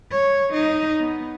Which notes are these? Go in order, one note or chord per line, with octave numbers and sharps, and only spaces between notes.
C#5
D#4
B3